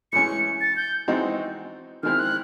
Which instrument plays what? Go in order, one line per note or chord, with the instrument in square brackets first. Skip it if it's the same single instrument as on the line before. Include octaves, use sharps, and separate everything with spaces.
[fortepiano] A2 E3 G#3 C#4 [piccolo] C#7
[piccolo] A6
G6
[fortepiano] E3 G#3 C4 D#4 F#4
[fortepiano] D#3 G#3 C4 E4 [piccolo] F6
[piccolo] F#6